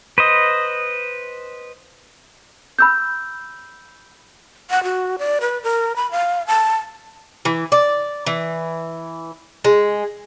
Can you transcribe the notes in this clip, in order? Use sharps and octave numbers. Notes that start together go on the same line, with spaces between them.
B4 C5 D#5
B5 E6 G6
F#5
F#4
D5
B4
A#4
B5
F5
A5
E3
D5
E3
G#3